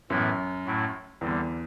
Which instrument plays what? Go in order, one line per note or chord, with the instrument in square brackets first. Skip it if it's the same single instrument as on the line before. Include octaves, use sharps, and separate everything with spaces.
[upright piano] F#2 [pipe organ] A2 E3 B3 E4
[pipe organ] A2 F#3 A3 E4
[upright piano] E2 [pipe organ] D3 G3 C4